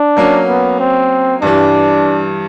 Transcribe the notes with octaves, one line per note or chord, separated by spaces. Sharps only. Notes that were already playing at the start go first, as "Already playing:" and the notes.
Already playing: D4
F#3 A#3 C#4
B3
C4
G2 E3 G3 D4